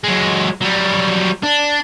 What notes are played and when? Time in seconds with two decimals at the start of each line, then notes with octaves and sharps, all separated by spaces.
0.04 F#3 G#3
0.62 F#3 G3
1.43 D4